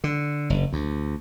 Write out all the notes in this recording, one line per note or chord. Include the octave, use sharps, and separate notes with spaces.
D3
F#1
D2